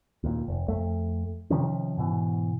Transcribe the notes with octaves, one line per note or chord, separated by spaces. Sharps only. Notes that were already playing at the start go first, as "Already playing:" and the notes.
D#2 A#2
F1
F2 A3
C3 D#3 F3 C#4
G#2 B2 E3